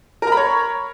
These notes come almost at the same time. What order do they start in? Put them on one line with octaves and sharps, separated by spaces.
A#4 A#5 B5 C#5